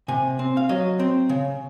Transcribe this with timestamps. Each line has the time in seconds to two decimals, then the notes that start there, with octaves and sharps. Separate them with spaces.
0.08 C3 G#5
0.39 C4
0.57 F5
0.69 F#3 D#5
0.99 C4
1.29 C#3